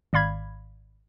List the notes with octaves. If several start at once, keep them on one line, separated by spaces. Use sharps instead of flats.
G#1 D5 F5 B5 G#6